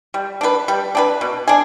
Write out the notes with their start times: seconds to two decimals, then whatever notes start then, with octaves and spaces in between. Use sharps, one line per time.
0.14 G3
0.41 D4 G#4 B4
0.68 G3
0.95 D4 G#4 B4
1.21 B2
1.48 D4 G#4